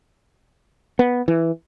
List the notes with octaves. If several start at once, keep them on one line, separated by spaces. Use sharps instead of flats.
B3
E3